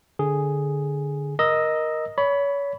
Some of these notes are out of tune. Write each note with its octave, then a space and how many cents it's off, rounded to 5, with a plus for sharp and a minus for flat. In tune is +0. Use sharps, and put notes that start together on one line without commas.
D3 +0 G#4 +0
A#4 +10 D#5 +0 E6 -10
C#5 +30 B5 +0